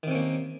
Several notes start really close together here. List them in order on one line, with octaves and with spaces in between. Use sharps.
D#3 C3 C#4 A#3